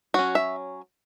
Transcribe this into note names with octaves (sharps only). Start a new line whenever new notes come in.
F#3 C#4 F#4
E5